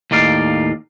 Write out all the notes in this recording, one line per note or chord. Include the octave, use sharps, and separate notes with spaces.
D#2 A2 D#4 D5 F5